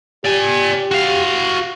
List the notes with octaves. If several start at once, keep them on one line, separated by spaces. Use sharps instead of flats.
G4 D5 G#5
F#4 F5